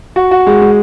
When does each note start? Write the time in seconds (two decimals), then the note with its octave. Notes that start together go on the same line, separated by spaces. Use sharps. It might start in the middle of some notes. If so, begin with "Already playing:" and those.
0.16 F#4
0.31 F#4
0.47 G#3
0.62 G#3